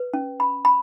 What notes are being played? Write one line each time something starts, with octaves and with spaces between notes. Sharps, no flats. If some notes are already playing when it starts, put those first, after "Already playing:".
Already playing: B4
C#4
B5
B5